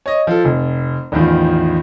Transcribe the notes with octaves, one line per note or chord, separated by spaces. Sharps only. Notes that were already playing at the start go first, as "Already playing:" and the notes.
C#5 D#5
F3 A4
F1
A1 E2 D#3 F3